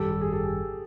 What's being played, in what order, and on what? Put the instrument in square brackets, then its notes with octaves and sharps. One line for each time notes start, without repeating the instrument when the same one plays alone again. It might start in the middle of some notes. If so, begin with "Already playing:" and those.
Already playing: [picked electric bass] G#1 F#2 D#3 G3 [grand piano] G4 A4
[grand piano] G4
G#4
G4 A4